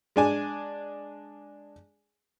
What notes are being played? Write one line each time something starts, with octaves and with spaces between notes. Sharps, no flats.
G#3 D4 G#5